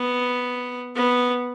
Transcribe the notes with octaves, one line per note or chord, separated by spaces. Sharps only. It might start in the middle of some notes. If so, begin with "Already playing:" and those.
Already playing: B3
B3